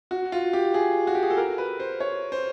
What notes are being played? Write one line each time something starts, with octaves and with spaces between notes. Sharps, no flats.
F#4
F4
G4
G#4
F#4
G4
G#4
A4
A#4
B4
C5
C#5
C5